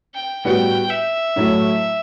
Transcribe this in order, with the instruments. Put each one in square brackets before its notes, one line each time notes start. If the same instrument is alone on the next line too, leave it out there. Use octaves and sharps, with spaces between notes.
[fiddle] G5
[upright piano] A2 G3 B3 F#4 [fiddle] G5
[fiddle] E5
[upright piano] A2 F#3 A3 E4